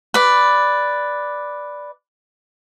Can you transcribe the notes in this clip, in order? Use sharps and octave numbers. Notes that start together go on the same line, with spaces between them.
B4 D5